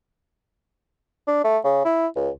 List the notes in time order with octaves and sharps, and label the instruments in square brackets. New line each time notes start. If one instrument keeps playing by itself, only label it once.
[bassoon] D4
A3
C#3
E4
C#2